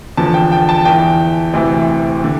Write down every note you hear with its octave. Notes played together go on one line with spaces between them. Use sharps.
E2 D3 F3 A5
G5
G5
A5
E2 E3 G5
D2 C3 E3
D3